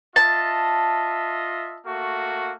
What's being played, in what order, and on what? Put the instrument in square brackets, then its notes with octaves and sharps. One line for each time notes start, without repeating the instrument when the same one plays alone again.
[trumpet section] F4 D#5 E5 [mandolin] A5
[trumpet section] A3 A#3 F#4